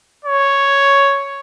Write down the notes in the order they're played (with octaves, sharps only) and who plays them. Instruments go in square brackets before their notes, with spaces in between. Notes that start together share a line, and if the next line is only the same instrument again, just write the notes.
[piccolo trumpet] C#5